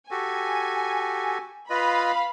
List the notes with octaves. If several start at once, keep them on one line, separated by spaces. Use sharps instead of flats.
F#4 G4 A4 G#5
F4 B4 D#5 F5 B5